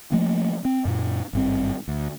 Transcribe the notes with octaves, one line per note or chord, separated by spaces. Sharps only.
F3 A3 A#3
C4
F#2 A#2
G#1 G2 C4
D2